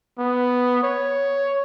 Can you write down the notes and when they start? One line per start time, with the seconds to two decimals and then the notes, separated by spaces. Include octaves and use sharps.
0.19 B3
0.83 C#5